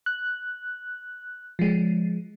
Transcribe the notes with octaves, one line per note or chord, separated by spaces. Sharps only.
F#6
F3 G#3